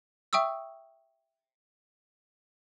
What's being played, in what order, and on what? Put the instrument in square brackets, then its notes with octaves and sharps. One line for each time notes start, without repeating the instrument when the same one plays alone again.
[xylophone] E5 G5 C#6 D#6 E6